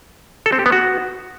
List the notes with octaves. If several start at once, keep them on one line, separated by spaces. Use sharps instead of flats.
A4
C4
G4
B3
F#4